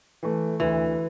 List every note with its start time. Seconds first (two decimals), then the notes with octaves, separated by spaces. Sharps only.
0.23 E3 A3
0.60 D2 E3